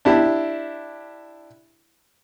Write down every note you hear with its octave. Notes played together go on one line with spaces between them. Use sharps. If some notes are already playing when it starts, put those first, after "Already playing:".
D4 E4 G4